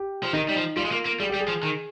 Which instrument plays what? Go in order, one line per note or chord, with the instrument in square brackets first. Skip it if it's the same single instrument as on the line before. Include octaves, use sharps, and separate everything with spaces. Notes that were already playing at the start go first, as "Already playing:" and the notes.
Already playing: [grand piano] G4
[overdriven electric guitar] F3
[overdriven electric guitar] D#3 [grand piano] D#4
[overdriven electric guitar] G3
F3
[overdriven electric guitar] G3 [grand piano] F4
[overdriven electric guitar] G#3
A#3
A#3
[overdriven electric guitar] G3 [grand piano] G#4
[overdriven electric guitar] G3 [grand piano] G4
[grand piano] G#4
[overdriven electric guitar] F3
D#3